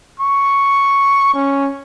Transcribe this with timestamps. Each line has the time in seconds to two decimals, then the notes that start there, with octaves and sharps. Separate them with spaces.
0.20 C#6
1.34 C#4